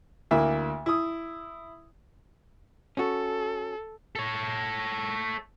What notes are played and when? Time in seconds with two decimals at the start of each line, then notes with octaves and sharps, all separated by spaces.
0.31 D2 A#3 E4 E5
0.86 E4 D#6
2.97 C#4 F#4 A4
4.16 A4 C#5